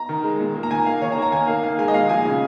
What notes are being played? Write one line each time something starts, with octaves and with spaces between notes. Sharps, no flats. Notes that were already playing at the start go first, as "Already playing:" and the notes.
Already playing: A#5
D#3
G#3
A#2
A#3
A#5
D#3 G#5
A#3 F5
D#3 C#5
A#5
A#3
A#5
D#3 G#5
A#3 F5
D#3 F5
G#3 G#5
D#5
A#2 F5
F3 G#3 G#5
C#3